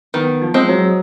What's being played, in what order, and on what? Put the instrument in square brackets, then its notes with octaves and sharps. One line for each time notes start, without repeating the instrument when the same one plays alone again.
[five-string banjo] D#3 [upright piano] B3
[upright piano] F3
[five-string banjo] G#3 C4
[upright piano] F#3